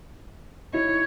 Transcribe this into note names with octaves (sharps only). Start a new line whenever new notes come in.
D#4 E4 C#5